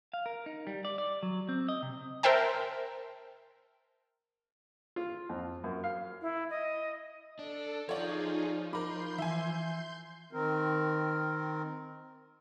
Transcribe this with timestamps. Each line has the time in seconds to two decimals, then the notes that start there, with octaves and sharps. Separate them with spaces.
0.14 F5
0.26 A#4
0.46 D#4
0.67 G3
0.85 D5
0.98 D5
1.23 F#3
1.49 C4
1.68 D#5
1.82 C3
2.23 A#4 C5 E5 G5 A5
4.96 F4
5.29 F2
5.64 F#2
5.84 F5
6.22 E4
6.50 D#5
7.39 D4 A4
7.89 F3 D#4 F4 G#4 A4 C#5 D5
8.73 D#4 F4 A#4 B5 C6 D6 G6
9.18 E3 E5 G#5
10.33 D#3 C4 A#4